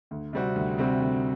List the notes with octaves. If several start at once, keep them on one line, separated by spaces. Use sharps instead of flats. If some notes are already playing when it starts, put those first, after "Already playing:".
D2
C3 G3 C4 F#4
D2
C3 G3 C4 F#4
D2